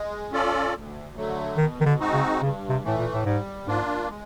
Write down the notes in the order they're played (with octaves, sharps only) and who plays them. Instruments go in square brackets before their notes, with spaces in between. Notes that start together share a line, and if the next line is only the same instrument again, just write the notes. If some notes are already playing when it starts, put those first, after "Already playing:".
Already playing: [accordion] G#3
C#4 F4 A4 D5
D2
D3 F#3 A3
[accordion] B2 [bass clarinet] D#3
[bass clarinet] D#3
D3
[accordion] G#3 C4 D#4 F#4
[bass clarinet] C#3
[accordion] G2 [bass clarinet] C#3
[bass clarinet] C3
[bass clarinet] A2 [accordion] E3 A3
[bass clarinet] A#2
A2
[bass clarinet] G#2 [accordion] G3
[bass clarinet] G#2 [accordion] A#3 D4 F4
[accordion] G#3